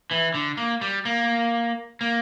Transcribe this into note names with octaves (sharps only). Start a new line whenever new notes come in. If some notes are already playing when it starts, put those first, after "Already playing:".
E3
D3
A#3
G3
A#3
A#3